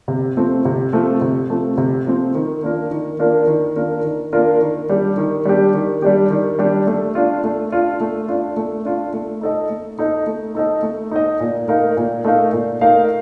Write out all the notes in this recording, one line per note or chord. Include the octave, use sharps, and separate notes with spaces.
C3
F3 A3 C4
C3
F3 A3 C4
C3
F3 A3 C4
C3
F3 A3 C4
D#3
A#3 D4 F4 A#4
D#3
A#3 D4 F4 A#4
D#3
A#3 D4 F4 A#4
D#3
A#3 D4 F4 A#4
D#3
G3 D4 G4
D#3
G3 D4 G4
D#3
G3 D4 G4
D#3
G3 D4 G4
A3
D4 F4
A3
D4 F4
A3
D4 F4
A3
D4 F4
A3
D#4 A4 D#5
A3
D#4 A4 D#5
A3
D#4 A4 D#5
A3
D#4 A4 D#5
A#2
A3 D#4 A#4 F5
A#2
A3 D#4 A#4 F5
A#2
A3 D#4 A#4 F5